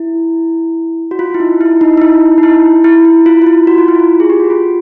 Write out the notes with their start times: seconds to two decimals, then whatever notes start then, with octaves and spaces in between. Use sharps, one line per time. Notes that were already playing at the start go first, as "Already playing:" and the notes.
Already playing: E4
1.11 F#4
1.19 F4
1.34 E4
1.40 D#4
1.61 E4
1.81 D#4
1.97 D#4
2.02 E4
2.38 D#4
2.43 E4
2.84 E4
3.05 E4
3.26 F4
3.42 F4
3.47 E4
3.67 F#4
3.78 F4
3.88 E4
3.99 F4
4.20 G#4
4.30 G4
4.40 F#4
4.50 F4